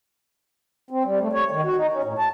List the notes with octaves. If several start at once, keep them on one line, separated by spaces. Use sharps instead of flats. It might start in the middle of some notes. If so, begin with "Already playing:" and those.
C4
G3
A3
C#5
D#3
F#4
D#4
C#4
A2
A5